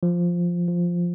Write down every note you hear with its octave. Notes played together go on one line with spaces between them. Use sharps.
F3
F3